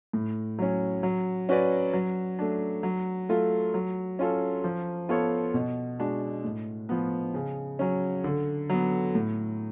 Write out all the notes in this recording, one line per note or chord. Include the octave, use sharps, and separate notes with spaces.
A2
F#3 C#4
F#3
C#4 F#4 B4 D5
F#3
A3 D4
F#3
A3 F4 A4
F#3
C#4 F4 A4
F3
B3 F4 A4 C#5
B2
G#3 D4 F#4
A2
F3 B3
C#3
F#3 C#4
D3
F#3 B3
A2